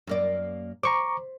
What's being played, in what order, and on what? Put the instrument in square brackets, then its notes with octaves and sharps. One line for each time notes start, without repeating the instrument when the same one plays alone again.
[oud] F#2 A#3 D5
[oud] C5 [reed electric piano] A#5 C#6 D6